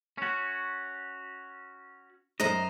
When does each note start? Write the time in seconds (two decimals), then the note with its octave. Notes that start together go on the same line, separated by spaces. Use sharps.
0.18 C#4 F#4
2.40 F#2 C5 D#5 A#5